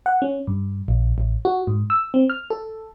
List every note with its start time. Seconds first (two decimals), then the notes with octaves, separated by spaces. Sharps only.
0.06 F#5
0.22 C#4
0.47 G2
0.88 A#1
1.18 A1
1.45 F#4
1.67 G#2
1.90 E6
2.14 C4
2.30 F6
2.50 A4